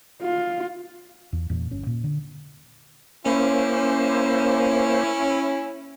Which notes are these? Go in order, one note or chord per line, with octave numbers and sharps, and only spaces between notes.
F4
E2
E2 A#2
G1 C#4
A#2
D3
A#3 C#4 E4 C5